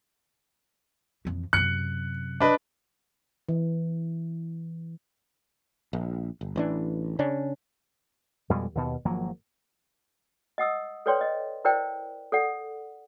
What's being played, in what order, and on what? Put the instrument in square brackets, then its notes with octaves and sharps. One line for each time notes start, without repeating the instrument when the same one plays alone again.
[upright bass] F2 E3
[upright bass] F#2 C3 [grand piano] F#6 C#7
[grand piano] D4 B4 D#5
[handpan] E3
[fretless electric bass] A#1
G1
A1 E3 D4
C#3 C#4 D4
[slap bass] F2 B2 G3 G#3
D#2 B2
G#1 F3 F#3 A#3
[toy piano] D#5 F#5 D#6 E6
A4 B4 C#5 D5 G5 C6
D#5
E4 A#4 C5 D5 G5
A4 D5 F#5